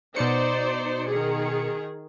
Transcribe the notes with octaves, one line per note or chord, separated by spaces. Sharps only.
B2 D#4 C5 D5 C#7
D#3 G#4